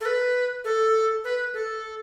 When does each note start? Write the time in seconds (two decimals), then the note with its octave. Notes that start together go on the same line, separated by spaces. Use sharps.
0.01 A4
0.05 B4
0.64 A4
1.24 B4
1.54 A4